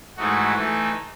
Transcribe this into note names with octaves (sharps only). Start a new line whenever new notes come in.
G#2 E3 A3 D#4 F#4
E3 A3 D#4